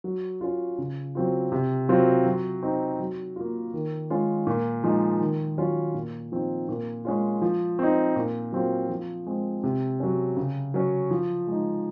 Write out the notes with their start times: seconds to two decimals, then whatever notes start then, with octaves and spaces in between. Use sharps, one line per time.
0.04 F#3
0.41 C#4 F4
0.78 C#3
1.15 F#3 C4 F4
1.52 C3
1.89 F#3 C4 F4
2.26 F#3
2.63 C4 D#4
2.99 F#3
3.36 A#3 F4
3.73 D#3
4.10 G#3 C#4 F4
4.47 A#2
4.84 F3 G#3 D#4
5.21 D#3
5.58 F#3 C#4 F4
5.94 A#2
6.32 F3 C4 D#4
6.69 A#2
7.05 G#3 C#4 F4
7.42 F3
7.79 C4 D#4
8.16 A#2
8.52 F#3 C4 F4
8.89 F3
9.27 G#3 C4
9.63 C3
10.00 F#3 C#4
10.37 C#3
10.74 F#3 C#4
11.11 F3
11.47 G#3 D#4